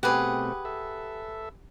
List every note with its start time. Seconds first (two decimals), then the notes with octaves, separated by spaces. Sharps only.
0.03 B2 A3 C4 G4 G#4 B4 F#5
0.65 A4 E5